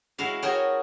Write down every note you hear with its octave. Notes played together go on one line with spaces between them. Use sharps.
G#3 E4 F#4 F5
F#4 G#4 A#4 C#5 G5